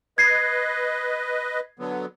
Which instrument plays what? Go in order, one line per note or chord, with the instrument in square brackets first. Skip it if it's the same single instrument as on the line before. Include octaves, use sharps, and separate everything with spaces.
[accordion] B4 D#5 [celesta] G#6 C7
[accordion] D3 F#3 B3